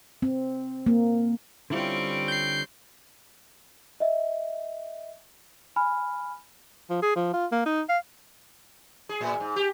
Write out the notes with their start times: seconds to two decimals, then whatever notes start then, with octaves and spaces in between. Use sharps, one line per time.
0.22 C4
0.86 A#3
1.70 D3 G3 C4 C#4 E4 F4
2.28 G6 C7
4.00 D#5 E5
5.76 G#5 B5 F6
6.90 F3
7.02 G#4
7.16 F3
7.34 F4
7.52 A#3
7.66 D#4
7.89 F5
9.09 G#4
9.21 A2
9.40 G#2
9.56 G4